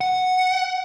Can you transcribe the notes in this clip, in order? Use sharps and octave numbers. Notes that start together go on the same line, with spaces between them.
F#5